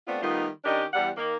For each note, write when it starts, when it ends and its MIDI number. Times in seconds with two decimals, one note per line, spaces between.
0.06 0.21 57
0.06 0.21 59
0.06 0.21 60
0.06 0.21 62
0.06 0.21 65
0.21 0.47 51
0.21 0.47 55
0.21 0.47 57
0.21 0.47 59
0.21 0.47 63
0.21 0.47 65
0.64 0.84 51
0.64 0.84 61
0.64 0.84 62
0.64 0.84 67
0.64 0.84 70
0.64 0.84 75
0.93 1.08 40
0.93 1.08 55
0.93 1.08 78
1.16 1.35 51
1.16 1.35 58